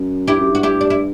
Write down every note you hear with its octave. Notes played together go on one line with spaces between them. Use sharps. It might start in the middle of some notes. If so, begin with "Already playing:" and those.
Already playing: F#2
G2 E4 G4
F#2
G2 F#4
E4 G4
D4
E4